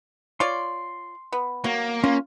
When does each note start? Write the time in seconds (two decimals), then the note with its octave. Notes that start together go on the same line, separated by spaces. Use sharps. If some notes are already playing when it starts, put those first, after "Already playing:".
0.40 F4 C#5 D5 C6
1.32 B3
1.64 F#3 A#3
2.04 C#4 F4